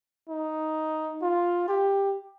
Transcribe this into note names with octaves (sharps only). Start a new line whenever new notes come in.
D#4
F4
G4